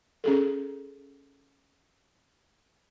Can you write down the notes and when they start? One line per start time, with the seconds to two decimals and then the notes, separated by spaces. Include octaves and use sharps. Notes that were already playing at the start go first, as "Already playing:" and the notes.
0.24 C#4 G#4 A4